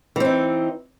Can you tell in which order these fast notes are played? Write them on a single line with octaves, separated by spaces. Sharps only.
E3 C4 D#4